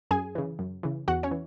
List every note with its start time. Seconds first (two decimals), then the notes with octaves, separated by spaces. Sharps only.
0.11 F#2 G#4 G#5
0.35 C#3 E3
0.59 F#2
0.83 C#3 E3
1.08 E2 F#4 F#5
1.23 C#4 C#5
1.31 E3